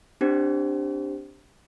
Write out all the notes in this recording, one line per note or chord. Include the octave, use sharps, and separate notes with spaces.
C4 D4 G4 C5